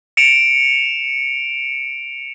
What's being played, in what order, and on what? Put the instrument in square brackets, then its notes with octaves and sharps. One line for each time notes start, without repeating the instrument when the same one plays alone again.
[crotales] C#7 D7 E7 F7